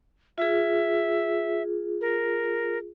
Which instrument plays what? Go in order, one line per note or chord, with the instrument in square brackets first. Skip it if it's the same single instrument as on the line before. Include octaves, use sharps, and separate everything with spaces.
[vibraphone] F4 G#4 [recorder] E5
[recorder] A#4